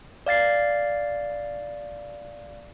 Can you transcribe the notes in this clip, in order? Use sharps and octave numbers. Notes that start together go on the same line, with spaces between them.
D5 F5 A6 C7